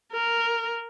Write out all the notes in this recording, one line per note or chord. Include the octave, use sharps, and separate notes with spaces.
A#4